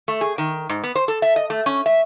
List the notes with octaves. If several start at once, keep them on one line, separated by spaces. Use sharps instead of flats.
A3
G#4
D#3
G#2
B3
C5
A4
E5
D#5
A3
C#4
E5